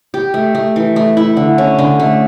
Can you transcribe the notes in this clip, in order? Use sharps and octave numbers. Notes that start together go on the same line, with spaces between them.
G4
A3
A3
E3
A3
E4
D3
C#4
D3
A3